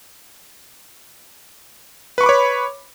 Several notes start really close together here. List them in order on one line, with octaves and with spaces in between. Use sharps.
B4 C#6 B5 D6 C#5